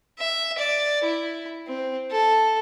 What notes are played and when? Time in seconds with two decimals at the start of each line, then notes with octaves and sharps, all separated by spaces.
0.19 E5
0.58 D5
1.04 E4
1.67 C4
2.11 A4